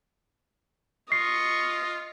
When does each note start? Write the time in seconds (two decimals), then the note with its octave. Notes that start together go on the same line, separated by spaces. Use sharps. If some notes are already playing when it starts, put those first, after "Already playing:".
1.12 F4 D#5 C#6 C7